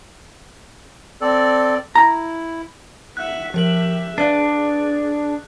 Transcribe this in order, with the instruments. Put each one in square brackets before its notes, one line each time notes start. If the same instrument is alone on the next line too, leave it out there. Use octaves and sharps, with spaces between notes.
[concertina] C4 A4 D5
[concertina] E4 [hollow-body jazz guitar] A#5
[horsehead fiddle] E5 F#5 [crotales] F#6
[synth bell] F3 A#4 F#7 [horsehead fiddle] G4 E5
[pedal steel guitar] D4 [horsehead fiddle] G#4 [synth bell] B4 D5 F5